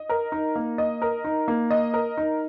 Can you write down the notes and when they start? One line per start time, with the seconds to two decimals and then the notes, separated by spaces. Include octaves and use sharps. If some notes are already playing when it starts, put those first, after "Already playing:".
Already playing: D#5
0.09 A#4
0.32 D#4
0.56 A#3
0.78 D#5
1.02 A#4
1.25 D#4
1.48 A#3
1.70 D#5
1.94 A#4
2.17 D#4